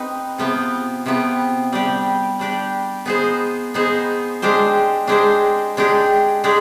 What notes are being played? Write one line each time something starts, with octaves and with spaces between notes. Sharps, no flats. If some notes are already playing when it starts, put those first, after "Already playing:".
Already playing: C4 D#4 B4
C3 F3 B3
C3 F3 B3
G3 D4 G4
G3 D4 G4
B3 D#4 G#4 C5
B3 D#4 G#4 C5
G#3 D4 G4 C5
G#3 D4 G4 C5
G#3 D4 G4
G#3 D4 G4